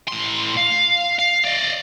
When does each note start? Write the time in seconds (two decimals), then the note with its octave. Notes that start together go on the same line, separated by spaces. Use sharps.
0.08 A2 C6
0.57 F5
1.19 F5
1.45 D5 D#5